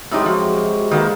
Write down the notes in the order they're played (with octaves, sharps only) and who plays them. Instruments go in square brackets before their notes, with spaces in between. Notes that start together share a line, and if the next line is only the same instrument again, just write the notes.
[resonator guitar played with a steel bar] A2 D#4 G4 [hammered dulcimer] C3 F#3 G#3
[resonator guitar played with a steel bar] F3 [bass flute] F#4
[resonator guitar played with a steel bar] D#3 A#3 B3